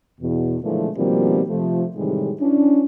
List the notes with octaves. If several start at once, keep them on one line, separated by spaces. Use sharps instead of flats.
E2 B2
A#2 D3 E3 F3 G#3 A3
B2 D#3 F3 G3 A#3 C4
C3 F3 A3
A2 C3 D#3 E3 G3 G#3
E3 C#4 D4